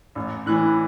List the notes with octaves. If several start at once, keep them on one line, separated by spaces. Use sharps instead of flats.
A1
A2 E3 F#6